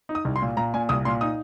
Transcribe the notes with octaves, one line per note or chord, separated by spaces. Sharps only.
D#4
D#6
C2
C6
A#2
A#2 A#5
A#2 G#5
C2 D#6
A#2 C6
D#4 D#6